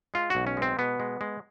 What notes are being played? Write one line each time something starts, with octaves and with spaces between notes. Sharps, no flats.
G#3 F4
B1 F#4
C#4
G#3
C4
B2 B3
G#3
G#3